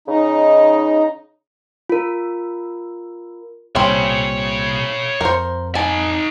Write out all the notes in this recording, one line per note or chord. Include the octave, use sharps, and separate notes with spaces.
C#3 D#4
F4 A#4
C2 A#2 G3 C4 C#4 C#5 B5
F2 A#4 C5
D#4 G#5 A5